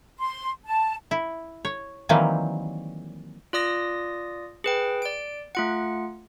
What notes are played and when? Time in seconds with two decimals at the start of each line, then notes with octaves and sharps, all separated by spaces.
0.19 C6
0.66 A5
1.11 E4
1.65 C#5
2.09 D#3 E3 F#3 G3 A#3 C4
3.53 F4 D5 D#6 A#6
4.64 G#4 B4 G5
5.02 D5 D7
5.55 A3 F4 F#5